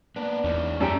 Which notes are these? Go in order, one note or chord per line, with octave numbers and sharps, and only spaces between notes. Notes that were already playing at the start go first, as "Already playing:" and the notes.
A#3 B3 D4
E2 C#4 D#4
F#2 G3 A3 G4